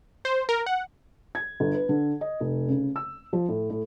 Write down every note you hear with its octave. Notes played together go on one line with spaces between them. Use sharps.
C5
A#4
F#5
G#6
G1
B4
D3
D#5
F1
C#3
E6
F3
A2
A2